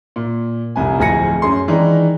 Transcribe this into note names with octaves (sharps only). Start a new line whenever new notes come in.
A#2
F1 C2 G#5
D1 F2 G#4 G#5 A#6 C#7
F#2 G#4 C6
D#3 E3 G#3 D4 D#4